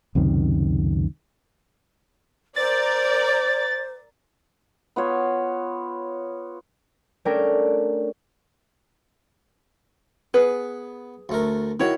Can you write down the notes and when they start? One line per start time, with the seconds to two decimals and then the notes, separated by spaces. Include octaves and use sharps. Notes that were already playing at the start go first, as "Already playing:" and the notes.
0.15 C#2 F#2 C3 D#3
2.56 A#4 C5 D5 A6
4.96 B3 F4 C#5
7.25 A3 C#4 D4 A#4 G5
10.34 B3 G#4 B4
11.29 D2 A3 A#4
11.80 D#3 E4 F#4 C#5